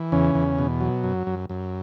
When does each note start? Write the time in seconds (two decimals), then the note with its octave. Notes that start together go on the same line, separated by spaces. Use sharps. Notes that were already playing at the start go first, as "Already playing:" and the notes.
Already playing: E3
0.12 E2 C#3 C#4
0.35 E2
0.58 B2
0.81 F#3
1.04 F#2
1.27 F#2
1.50 F#2